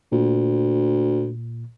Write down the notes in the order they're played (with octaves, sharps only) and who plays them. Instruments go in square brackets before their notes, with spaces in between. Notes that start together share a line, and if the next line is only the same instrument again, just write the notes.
[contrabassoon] D2 [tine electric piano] A#2